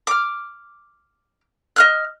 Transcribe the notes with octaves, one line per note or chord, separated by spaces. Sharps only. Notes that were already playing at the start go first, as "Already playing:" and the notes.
D6 F6
D#5 F6 F#6